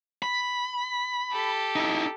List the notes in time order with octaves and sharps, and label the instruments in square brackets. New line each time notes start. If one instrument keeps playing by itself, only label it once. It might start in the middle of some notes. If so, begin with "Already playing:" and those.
[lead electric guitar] B5
[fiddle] G4 A4
[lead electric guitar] D#4 E4